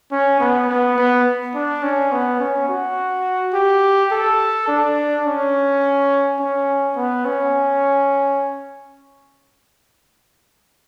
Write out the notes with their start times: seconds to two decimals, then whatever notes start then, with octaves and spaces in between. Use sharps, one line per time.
0.12 C#4
0.40 B3
0.69 B3
0.98 B3
1.55 D4
1.83 C#4
2.12 B3
2.40 C#4
2.69 F#4
3.54 G4
4.12 A4
4.68 D4
5.26 C#4
6.39 C#4
6.96 B3
7.25 C#4